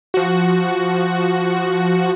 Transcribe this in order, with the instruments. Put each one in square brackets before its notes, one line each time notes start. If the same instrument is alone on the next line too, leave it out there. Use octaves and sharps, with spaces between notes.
[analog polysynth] F3 F#4